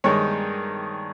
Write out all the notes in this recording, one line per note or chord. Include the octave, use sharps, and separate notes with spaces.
G2 D#3 G#3 C#5